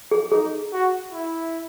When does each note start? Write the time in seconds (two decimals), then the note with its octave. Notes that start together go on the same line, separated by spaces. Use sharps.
0.11 G#4
0.32 D#4 G#4
0.73 F#4
1.12 E4